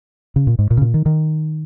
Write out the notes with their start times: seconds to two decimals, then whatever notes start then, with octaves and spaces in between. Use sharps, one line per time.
0.36 C#3
0.47 A#2
0.59 G#2
0.71 A#2
0.77 C#3
0.82 A#2
0.94 D#3
1.06 D#3